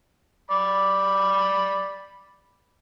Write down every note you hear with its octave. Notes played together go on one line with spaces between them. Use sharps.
D5 B5